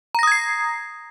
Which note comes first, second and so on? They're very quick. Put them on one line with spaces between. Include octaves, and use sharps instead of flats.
A#5 A#6 D#6 G#6 C7